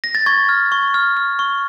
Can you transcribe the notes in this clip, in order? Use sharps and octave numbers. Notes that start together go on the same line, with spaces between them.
A#6
A6
C#6 G#6
F6
C#6
F6
F6
C#6